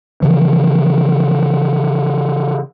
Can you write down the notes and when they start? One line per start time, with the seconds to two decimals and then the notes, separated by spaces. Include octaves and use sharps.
0.22 C#3 E3 F3